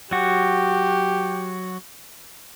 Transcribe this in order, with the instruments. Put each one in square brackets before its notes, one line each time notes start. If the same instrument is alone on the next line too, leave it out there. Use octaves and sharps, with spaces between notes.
[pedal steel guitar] F#3 F#4 [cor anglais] G4